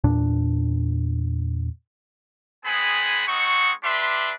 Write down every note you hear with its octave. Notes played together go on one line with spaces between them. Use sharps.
E2 A#2 D4
G#3 B3 C4 G#4 G#5 B5
G#3 C4 D#4 F#5 C#6
D4 G4 B4 E5 C6